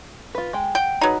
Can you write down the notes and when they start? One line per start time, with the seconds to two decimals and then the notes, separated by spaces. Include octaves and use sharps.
0.35 F4 B4
0.53 G#3 G5
0.75 F#5 G5
1.01 F#3 D#4 G#4 B4